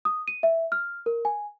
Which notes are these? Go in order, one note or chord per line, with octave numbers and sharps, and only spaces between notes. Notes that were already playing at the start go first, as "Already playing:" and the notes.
D#6
D#7
E5
F6
A#4
G#5